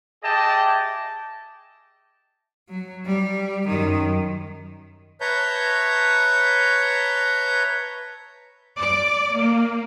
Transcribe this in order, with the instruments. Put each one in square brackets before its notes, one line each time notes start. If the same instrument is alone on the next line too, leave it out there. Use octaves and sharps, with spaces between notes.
[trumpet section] G4 G#4 D#5 E5 G5 A5
[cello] F#3
G3
F#2 D#3
[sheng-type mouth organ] B4 C#5 E5 A5 A#5 G6
[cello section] D5
A#3